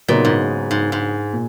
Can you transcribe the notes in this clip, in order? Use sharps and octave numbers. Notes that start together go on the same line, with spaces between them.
A#2 C#3 F#3 B3 D#4
G#2
G#2
G#2
A#2